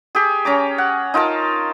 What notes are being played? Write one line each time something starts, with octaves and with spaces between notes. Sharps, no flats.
G4 G#4
C#4 A#5 D6
F#5
D#4 F4 A#4 A5